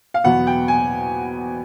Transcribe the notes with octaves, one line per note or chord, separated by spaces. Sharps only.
F5
E2 B2 F#3 B3 F#5
G5
G#5